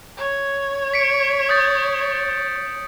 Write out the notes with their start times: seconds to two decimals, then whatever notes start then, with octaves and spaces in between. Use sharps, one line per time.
0.17 C#5
0.93 B6 C#7 D7
1.49 D#6 G6 A6